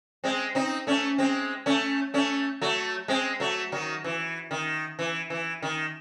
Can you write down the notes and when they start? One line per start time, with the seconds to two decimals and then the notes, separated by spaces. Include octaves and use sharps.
0.24 G#3 C4
0.55 C4 D#4
0.87 A3 C#4
1.18 G#3 C4
1.66 A3 C#4
2.14 A3 C#4
2.62 F#3 A3
3.08 G#3 C4
3.40 F#3 A3
3.72 D#3 F#3
4.04 E3
4.51 D#3
4.99 E3
5.30 E3
5.62 D#3